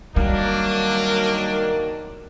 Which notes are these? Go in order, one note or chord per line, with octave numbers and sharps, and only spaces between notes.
D#3 F#3 G3 A#3 D4